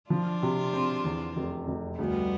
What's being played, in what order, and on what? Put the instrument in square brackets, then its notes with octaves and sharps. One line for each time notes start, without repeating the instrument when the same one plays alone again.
[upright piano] F3 [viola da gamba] D4 F4
[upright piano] C3
C4
E2
F1
F1
[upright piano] D2 [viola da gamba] G3 B3